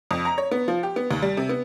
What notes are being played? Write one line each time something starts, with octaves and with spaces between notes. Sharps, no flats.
F2
A#5
C#5
B3
F3
G4
B3
D#2
G3
C3
B3